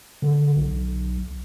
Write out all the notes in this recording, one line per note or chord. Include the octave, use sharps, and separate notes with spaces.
D3
B1